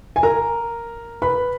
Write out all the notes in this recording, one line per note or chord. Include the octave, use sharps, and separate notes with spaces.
G#5
A#4 A#5
B4 B5